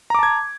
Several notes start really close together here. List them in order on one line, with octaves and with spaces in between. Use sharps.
A#5 D6 A5 G#6